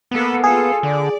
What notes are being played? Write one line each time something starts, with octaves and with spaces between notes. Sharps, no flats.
A#3 B3 A4 B4
F4 G#4 A4 F5
D3 D5